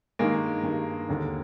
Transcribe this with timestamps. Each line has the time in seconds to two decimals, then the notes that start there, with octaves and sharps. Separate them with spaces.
0.19 G2 D#3 G#3 A#3
0.63 G2 D#3
1.09 D#2 D3